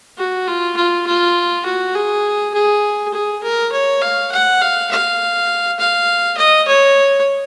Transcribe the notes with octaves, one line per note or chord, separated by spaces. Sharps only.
F#4
F4
F4
F4
F#4
G#4
G#4
G#4
A#4
C#5
F5
F#5
F5
F5
F5
D#5
C#5